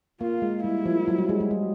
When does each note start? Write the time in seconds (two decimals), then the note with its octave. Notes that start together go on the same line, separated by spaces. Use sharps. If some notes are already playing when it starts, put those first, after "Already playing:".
0.21 A#3 F4
0.42 G#3
0.64 G3 E4
0.85 F3
1.08 F#3
1.18 G3
1.29 G#3
1.40 G#3
1.51 G3